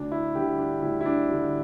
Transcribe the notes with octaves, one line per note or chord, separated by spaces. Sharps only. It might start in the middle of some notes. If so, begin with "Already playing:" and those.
Already playing: D2 D4
E4
D3 G3 G4
D4
D2 E4
E4
D4
D3 G3